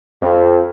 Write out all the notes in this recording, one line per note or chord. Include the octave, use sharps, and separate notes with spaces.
F2